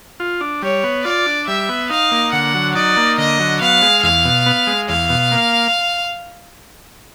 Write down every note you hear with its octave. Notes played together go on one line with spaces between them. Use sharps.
F4
D4
G3 C#5
B3
F4 D5
D4
G3 E5
B3
D#4 F5
A#3
D3 F#5
F#3
D#4 D5
A#3
D3 D#5
F#3
B3 F5
G#3
E2 F5
B2
B3
G#3
E2 F5
B2
A#3